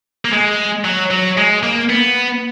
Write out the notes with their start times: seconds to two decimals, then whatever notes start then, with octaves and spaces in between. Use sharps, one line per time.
0.25 A#3
0.33 G#3
0.85 F#3
1.11 F#3
1.38 G#3
1.63 A#3
1.90 B3